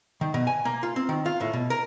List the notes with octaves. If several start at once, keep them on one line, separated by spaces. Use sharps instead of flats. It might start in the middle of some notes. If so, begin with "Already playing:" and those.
D#3
B2
G#5
A#3
F4
C4
D#3
F4
A2
B2
A#4